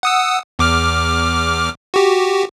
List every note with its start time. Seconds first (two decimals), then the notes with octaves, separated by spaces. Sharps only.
0.03 F#5 D#6 E6
0.59 E2 D6 F6
1.94 F#4 G4